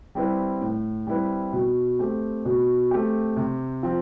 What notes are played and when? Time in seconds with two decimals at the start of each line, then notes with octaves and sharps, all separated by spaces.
0.15 G3 C4 E4 B4
0.61 A2
1.07 G3 C4 E4 B4
1.53 B2
1.99 A3 C4 G4
2.45 B2
2.91 A3 C4 G4
3.37 C3
3.83 F3 C4